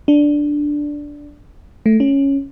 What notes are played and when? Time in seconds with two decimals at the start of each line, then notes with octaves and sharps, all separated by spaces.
0.08 D4
1.86 A3
2.00 C#4